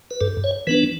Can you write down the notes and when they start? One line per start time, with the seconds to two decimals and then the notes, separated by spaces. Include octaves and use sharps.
0.11 B4
0.21 G2 A4
0.44 C#5
0.67 E3 B3 D4 B4